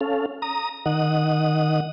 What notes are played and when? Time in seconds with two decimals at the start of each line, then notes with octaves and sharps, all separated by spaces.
0.01 C#4 A4 F5
0.42 A#5 D#6
0.86 D#3 F#5 D#6